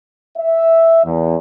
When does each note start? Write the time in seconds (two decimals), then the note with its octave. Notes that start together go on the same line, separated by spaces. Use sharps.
0.37 E5
1.04 E2